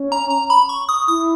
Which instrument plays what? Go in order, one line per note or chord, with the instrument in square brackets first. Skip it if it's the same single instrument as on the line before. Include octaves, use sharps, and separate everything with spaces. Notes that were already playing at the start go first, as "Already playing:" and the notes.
Already playing: [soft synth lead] C#4
[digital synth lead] A#5
A#5
B5
C#6
D#6
[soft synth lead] E4 [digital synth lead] D#6